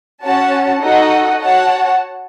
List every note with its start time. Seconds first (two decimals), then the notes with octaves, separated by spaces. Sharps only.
0.23 C#4 F#4 C#5 F#5 A5
0.82 D#4 F#4 A4 D#5 F#5
1.42 F#4 C#5 F#5 A5